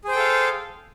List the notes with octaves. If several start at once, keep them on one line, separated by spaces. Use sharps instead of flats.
G#4 A4 C5 F5 G5